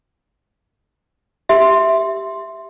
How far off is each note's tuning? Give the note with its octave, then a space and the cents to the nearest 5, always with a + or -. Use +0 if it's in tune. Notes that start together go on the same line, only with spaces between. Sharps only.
G4 +0 E5 +0 C6 +0